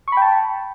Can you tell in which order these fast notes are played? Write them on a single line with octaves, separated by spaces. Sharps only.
C#6 B5 G5 A5